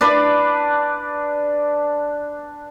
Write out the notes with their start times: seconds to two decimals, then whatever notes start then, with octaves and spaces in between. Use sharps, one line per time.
0.01 D4 B4 D5